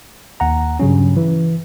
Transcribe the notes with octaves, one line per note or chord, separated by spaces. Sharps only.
D#2 F#5 A#5
G2 C#3 F#3 C#4
E3